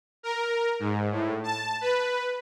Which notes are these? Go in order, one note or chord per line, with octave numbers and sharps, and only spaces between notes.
A#4
G#2
A2
A5
B4